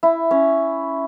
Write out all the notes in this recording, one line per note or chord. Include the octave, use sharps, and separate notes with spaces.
E4
C#4